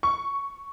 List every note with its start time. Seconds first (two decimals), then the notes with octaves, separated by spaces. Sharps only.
0.03 C#6